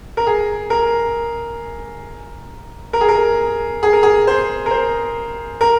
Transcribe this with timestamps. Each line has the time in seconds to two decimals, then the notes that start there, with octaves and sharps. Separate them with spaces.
0.17 A#4
0.27 G#4
0.70 A#4
2.93 A#4
3.01 G#4
3.09 A#4
3.83 G#4
3.93 A#4
4.03 G#4
4.27 C5
4.66 A#4
4.71 C5
5.61 A#4